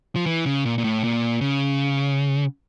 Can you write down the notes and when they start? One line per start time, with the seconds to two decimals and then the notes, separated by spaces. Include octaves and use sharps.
0.16 F3
0.26 E3
0.46 C#3
0.65 A#2
0.78 A#2
0.84 A2
1.04 A#2
1.41 C#3